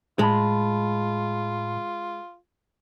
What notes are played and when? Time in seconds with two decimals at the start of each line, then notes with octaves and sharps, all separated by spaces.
0.19 A2 G#3 F4 A5 B5